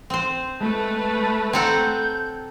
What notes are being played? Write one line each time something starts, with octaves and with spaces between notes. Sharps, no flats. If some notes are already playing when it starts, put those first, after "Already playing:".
C4 C5
G#3 A3 B4 A5
C4 A4 C#5 F#5 A#5 G6